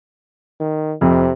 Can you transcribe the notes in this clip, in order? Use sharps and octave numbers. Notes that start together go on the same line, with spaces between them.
D#3
F2 C3